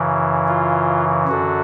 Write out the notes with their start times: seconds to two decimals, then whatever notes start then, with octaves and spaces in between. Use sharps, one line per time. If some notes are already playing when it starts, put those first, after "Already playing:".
Already playing: F#2 C#3 E3
0.48 F4
1.28 F#2 D3 F#4